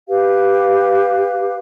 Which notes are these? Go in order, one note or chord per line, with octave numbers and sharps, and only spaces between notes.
G4 B4 F5